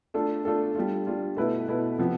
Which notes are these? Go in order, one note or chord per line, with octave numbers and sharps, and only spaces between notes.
A3 D4 F4 A4
A3 D4 F4 A4
G3 D4 F4
G3 D4 F4
B2 A3 E4 B4
B2 A3 E4 B4
C3 F3 B3